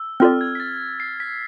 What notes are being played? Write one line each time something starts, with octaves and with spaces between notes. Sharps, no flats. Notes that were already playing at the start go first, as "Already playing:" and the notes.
Already playing: E6
C4 F4 A4 D5 F6
G#6
B6
A6
C7
B6